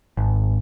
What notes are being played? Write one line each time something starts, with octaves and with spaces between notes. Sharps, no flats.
G#1